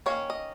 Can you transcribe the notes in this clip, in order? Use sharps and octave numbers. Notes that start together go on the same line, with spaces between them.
D#3 A#3 C#4 C#5
D#5